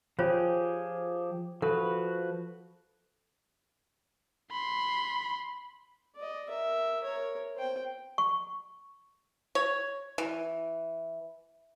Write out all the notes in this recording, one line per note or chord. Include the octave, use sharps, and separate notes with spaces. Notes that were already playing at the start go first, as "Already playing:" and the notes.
F3 F4 G4 G#4 C5 C#5
F3 F#4 A4 B4
B5 C6
D5 D#5
A#4 E5
A#4 C#5
C5 G5
C#6
C#5
E3